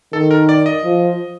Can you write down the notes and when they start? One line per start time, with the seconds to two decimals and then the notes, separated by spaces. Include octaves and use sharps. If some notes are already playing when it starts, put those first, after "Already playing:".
0.13 D#3 A4
0.31 A#4
0.49 D5
0.66 D#5
0.84 F3